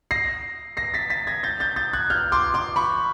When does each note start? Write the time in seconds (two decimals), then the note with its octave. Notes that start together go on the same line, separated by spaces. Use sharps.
0.11 A#6 C7
0.77 A#6 C7
0.94 A6 B6
1.10 A6 B6
1.27 G#6 A#6
1.43 G6 A6
1.60 G6 A6
1.76 G6 A6
1.93 F#6 G#6
2.10 F6 G6
2.32 C6 D6
2.54 C6 D6
2.76 B5 C#6